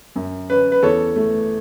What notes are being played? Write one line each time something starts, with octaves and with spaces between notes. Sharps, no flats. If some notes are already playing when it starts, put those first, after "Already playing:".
F#2
C#4 B4
B4
E2 A4 C#5
A3